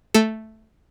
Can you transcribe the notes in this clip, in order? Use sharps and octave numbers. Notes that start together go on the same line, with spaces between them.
A3 A4